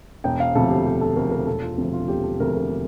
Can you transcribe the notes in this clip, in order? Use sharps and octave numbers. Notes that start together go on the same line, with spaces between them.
E1 G5
F5
D2 C3 F3 A4
G4
E1 G4
A4
D2 C3 F3 A#4
A#4
E1 A4
F4
D2 C3 F3
F4
E1 G4
A4
D2 C3 F3 A#4
A#4